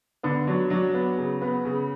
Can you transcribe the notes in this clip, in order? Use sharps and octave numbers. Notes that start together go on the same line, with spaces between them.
D3 B3
F#3 D4
F#3 D4
B3
C#3
B3
C#3